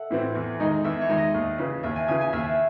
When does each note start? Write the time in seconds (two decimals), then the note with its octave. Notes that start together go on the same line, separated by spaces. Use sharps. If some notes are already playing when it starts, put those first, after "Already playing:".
Already playing: A4 E5 F#5
0.11 A2 E3 C4 E4
0.35 E2
0.60 D#3 G#3 D#4
0.84 E2 E5
1.01 C#5
1.09 D#3 G#3 D#4
1.17 D#5
1.34 D#2
1.58 C#3 E3
1.83 D#2 E5
1.96 G#5
2.08 C#3 E3 G#5
2.21 G#5
2.33 D#2 E5